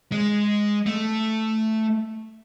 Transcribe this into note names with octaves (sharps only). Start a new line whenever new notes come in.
G#3
A3